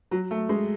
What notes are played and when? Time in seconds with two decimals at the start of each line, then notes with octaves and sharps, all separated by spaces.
0.11 F#3
0.31 A3
0.49 G#3